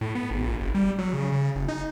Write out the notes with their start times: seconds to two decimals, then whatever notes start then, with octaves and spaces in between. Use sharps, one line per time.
0.01 A2
0.15 B3
0.31 G#1
0.43 A#1
0.60 F#1
0.75 G3
0.98 F#3
1.13 C#3
1.32 C#3
1.56 F#1
1.68 D#4